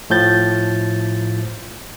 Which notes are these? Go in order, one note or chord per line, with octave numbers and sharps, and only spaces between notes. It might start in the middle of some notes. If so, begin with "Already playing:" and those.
A2 F3 G6 A6